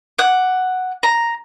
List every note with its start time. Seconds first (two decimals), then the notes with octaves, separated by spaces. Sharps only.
0.19 F#5 D6
1.03 A#5